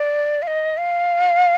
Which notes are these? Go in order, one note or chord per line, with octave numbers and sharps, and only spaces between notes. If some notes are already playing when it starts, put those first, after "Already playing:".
Already playing: D5
F5
D#5
F5